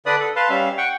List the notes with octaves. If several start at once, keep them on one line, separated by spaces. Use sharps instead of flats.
D3 D4 B4 D5 B5 D#6
A4
B4 F5 A5 C6
G3 C#4 E5 F5
F#5 G5 C#6